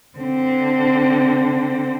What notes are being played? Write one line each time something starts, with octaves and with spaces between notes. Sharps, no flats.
D3 C4